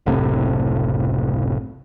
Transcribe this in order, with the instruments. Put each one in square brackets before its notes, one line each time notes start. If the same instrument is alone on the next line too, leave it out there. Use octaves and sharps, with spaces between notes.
[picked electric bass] F#1 C2 A2 C3